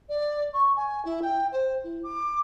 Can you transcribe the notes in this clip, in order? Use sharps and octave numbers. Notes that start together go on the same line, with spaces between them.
D5
C#6
G#5
E4
G5
C5
E4
D6